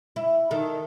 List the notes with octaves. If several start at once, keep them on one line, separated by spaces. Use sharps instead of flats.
E4
D#3 A4